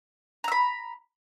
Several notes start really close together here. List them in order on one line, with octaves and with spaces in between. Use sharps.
A#5 E6 B5